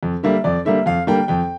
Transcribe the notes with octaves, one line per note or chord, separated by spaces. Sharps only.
F2
D3 G3 A#3 E5
F2 D5
D3 G3 A#3 E5
F2 F5
D3 G3 A#3 G5
F2 G5